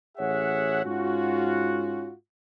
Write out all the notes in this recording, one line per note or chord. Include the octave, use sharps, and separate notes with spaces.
A1 G#4 C#5 E5 F#5
G#2 C#4 F4 F#4